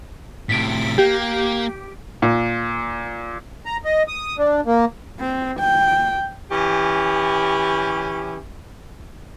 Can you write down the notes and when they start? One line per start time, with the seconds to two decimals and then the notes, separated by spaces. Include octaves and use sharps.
0.49 A2 C3 B6 D7
0.98 A#3 G4
2.22 A#2
3.66 A#5
3.85 D#5
4.08 D#6
4.38 D4
4.66 A#3
5.20 C4
5.60 G5
6.51 E3 C#4 G4